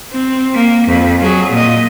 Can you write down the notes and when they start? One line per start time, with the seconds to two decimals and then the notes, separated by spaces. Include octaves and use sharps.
0.11 C4
0.54 A#3
0.88 F2
1.20 F#3 G#4
1.51 A#2 D#5